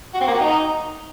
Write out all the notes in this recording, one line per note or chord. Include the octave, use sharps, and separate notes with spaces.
F#4
C4
A#3
F#4
D#4